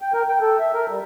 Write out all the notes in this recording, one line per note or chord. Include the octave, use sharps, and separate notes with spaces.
G5
A#4
G5
A4
E5
A#4
G3